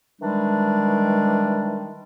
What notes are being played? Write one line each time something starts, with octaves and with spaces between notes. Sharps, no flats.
D#3 E3 G3 G#3 D4